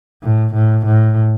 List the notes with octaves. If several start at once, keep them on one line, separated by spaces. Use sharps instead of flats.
A2
A2
A2